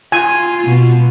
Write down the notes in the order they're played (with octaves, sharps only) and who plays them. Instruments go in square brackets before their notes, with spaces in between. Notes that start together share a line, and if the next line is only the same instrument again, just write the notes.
[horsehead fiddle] F4 [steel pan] G#5
[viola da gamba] B2